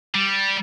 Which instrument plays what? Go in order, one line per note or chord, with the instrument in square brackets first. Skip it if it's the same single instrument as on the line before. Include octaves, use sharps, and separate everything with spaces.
[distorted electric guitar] G3